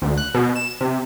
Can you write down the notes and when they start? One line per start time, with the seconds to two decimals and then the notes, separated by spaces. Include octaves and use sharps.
0.02 D2
0.18 F#6
0.34 B2
0.56 E7
0.81 C3